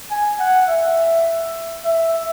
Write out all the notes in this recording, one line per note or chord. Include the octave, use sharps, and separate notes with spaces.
G#5
F#5
E5
E5